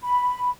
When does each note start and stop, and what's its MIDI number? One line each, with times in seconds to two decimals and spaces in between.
0.02 0.50 83